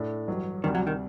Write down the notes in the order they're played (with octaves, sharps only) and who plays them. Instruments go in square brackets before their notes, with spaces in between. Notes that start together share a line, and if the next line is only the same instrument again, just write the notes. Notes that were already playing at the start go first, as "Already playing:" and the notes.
Already playing: [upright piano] A2 A3 D4 A4
A1 G2 F#3
[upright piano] D2 C3 G3 [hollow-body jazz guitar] D#3
[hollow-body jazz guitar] F#3
D#3